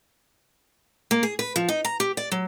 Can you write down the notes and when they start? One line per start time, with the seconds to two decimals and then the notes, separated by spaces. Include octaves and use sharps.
1.11 A#3
1.23 G#4
1.39 B4
1.56 F3
1.69 D#4
1.85 A#5
2.00 G4
2.17 D5
2.32 F#3